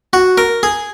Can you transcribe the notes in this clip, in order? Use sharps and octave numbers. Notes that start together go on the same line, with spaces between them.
F#4
A#4
G#4